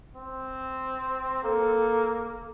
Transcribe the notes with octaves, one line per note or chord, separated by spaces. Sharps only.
C4
A#3 A4